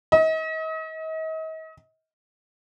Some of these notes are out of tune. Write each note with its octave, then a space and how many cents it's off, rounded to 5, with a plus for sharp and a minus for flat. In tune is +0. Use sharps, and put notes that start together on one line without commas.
D#5 +40